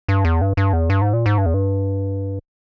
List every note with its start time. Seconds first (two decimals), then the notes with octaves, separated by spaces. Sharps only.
0.09 G2
0.25 E2
0.41 G2
0.57 G2
0.73 E2
0.90 G2
1.02 G#2
1.13 A#2
1.26 G#2
1.38 G2
1.46 E2
1.54 G2